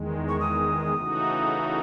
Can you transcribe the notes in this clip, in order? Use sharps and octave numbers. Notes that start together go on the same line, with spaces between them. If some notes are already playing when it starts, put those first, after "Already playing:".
Already playing: E2 D#3 G#3
C#6
D#6
C#3 E3 A3 D#4 F#4